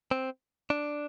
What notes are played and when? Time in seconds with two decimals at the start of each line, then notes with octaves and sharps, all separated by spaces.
0.11 C4
0.70 D4